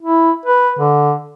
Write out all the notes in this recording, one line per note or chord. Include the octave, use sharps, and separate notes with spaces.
E4
B4
D3